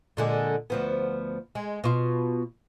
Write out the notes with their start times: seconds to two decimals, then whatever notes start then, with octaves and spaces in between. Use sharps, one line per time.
0.17 A#2 D3 G#3
0.70 D2 F3 B3
1.55 G#3
1.84 B2 F4